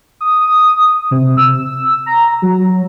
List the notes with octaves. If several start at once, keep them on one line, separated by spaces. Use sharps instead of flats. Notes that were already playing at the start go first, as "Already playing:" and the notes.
D#6
C3
E6
A#5
F#3